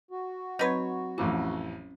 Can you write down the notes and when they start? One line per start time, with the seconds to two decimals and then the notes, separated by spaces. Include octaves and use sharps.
0.11 F#4
0.59 F#3 C4 D#4 B4 C#5 G#6
1.18 A1 F2 E3 C#4 D6